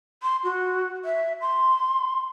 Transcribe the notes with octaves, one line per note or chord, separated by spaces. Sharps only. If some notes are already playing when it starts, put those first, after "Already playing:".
C6
F#4
E5
C6